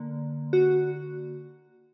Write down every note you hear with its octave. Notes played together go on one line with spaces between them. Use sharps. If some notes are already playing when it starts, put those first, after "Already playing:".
Already playing: D3 A#3
F#4